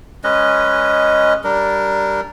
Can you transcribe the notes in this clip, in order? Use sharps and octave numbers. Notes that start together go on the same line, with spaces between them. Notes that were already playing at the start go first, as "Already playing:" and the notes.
G#3 C#4 B4 D#5
G3 D4 A#4